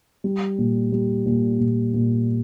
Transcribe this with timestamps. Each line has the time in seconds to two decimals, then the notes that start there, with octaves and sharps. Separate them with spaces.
0.24 G3
0.58 A#2
0.92 G3
1.26 A#2
1.60 A#2
1.94 A#2